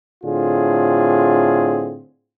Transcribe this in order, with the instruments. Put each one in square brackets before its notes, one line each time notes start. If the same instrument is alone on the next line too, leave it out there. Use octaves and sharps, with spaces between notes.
[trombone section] A2 D3 C4 F4 G#4